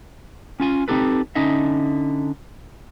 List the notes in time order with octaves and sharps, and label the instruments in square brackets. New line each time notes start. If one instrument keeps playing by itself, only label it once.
[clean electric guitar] C#4 F4 G#5
C4 D#4 G4 A4 B4
D3 C#4 D#4 D#5 E5